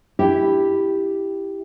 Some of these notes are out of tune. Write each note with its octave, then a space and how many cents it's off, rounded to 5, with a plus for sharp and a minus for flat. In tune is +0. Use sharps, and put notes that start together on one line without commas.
E4 +0 G4 +0